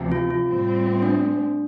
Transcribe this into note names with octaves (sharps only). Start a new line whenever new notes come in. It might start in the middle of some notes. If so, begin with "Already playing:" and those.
Already playing: D2 C3 F3
F4
F4
A2 G3 C4
D4